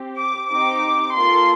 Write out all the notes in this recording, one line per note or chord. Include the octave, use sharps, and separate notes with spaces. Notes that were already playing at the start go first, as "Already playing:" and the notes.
Already playing: C4 G4
D6
C4 D#4 G4 D6
A#3 F4 A4 C6